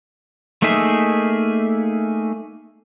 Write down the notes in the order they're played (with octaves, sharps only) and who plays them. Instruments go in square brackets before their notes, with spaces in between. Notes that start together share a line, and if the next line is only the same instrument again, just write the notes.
[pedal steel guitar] A3 A#3 D#4 G#4 E5